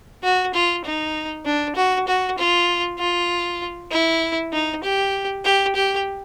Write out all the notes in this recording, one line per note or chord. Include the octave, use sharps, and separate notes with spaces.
F#4
F4
D#4
D4
F#4
F#4
F4
F4
E4
D#4
G4
G4
G4